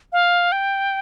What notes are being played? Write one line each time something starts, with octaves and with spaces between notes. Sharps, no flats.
F5
G5